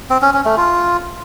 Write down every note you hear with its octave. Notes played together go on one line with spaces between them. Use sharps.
C4
C#4
C#4
A3
F4